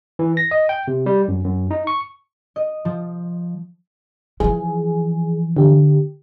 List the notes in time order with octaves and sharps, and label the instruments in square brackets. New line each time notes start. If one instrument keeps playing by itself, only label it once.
[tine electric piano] E3
A#6
D#5
G5
C3
G3
F#2
F#2
D#4
C#6
[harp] D#5
F3
[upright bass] E3 F3 [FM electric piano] G#4
[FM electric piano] D3 G4